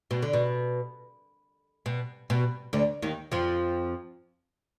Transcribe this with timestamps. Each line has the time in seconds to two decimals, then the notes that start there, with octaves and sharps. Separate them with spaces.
0.11 B2
0.22 D3
0.33 B2
1.86 B2
2.30 B2
2.73 D2 D3
3.02 D#2 D#3
3.32 F2 F3